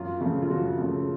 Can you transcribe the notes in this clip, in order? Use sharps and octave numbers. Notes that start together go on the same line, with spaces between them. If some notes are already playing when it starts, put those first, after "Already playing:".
Already playing: F#2 F4
C#3 F3 A3
F4
F#2 F#4
C#3 F3 A3